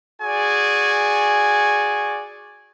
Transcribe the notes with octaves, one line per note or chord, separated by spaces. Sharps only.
F#4 G#4 D5 G#5